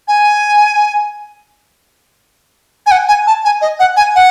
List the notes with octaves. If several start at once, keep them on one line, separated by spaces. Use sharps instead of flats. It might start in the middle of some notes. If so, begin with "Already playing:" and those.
G#5
G#5
F#5
G#5
A5
G#5
D#5
F#5
G#5
F#5